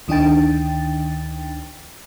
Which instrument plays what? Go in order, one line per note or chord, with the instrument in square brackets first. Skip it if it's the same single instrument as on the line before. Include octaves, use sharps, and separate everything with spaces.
[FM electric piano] D2 D#3 D4 D#4 G5 A6